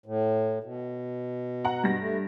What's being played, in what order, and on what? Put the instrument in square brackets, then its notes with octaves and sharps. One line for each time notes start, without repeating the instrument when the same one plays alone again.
[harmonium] A2
B2
[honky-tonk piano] F#5 A#5
G2 A#6
[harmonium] A3